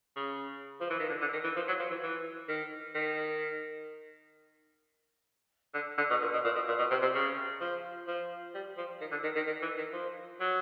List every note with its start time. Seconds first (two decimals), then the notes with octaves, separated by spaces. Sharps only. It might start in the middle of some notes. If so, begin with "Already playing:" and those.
0.16 C#3
0.80 F3
0.90 E3
0.99 D#3
1.10 D3
1.21 D3
1.33 D#3
1.44 E3
1.56 F3
1.68 F#3
1.80 F3
1.90 E3
2.03 E3
2.48 D#3
2.95 D#3
5.74 D3
5.98 D3
6.10 B2
6.22 A#2
6.33 B2
6.45 A#2
6.55 B2
6.67 A#2
6.79 B2
6.91 C3
7.02 C3
7.15 C#3
7.61 F3
8.08 F3
8.54 G3
8.77 F3
9.01 D#3
9.11 D3
9.23 D#3
9.35 D#3
9.46 D#3
9.62 E3
9.78 D#3
9.93 F3
10.40 F#3